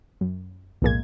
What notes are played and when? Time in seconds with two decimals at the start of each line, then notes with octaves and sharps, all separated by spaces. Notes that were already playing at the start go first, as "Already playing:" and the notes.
0.21 F#2
0.82 B1 F2 A2 G#3 A#3 G#6